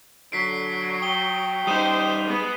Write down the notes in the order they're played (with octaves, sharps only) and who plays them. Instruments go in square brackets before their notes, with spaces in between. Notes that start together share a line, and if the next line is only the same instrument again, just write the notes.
[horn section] D3 [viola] F#3 [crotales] B6 C7 D7
[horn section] G5 [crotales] D#6 G7
[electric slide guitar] G3 D#4 [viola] C5 [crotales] D#6 D#7 E7
[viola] G#3 B3